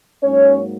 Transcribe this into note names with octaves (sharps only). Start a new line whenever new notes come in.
G#2 F#3 A#3 C#4 C#5